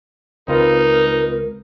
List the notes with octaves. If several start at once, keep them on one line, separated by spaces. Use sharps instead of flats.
C#2 C4 D#4 F4 A#4 B4